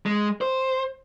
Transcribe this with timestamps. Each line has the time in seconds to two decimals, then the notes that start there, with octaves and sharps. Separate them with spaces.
0.06 G#3
0.41 C5